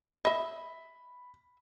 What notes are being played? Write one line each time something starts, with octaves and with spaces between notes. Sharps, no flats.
D#5 E5 B5